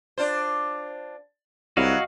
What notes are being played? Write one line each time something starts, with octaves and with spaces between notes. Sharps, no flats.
D4 F4 C5
C2 F#3 E4 F#4 D#5 F5